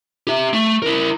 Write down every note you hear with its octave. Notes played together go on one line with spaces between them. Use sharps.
G4 E5
A3
E4 A#4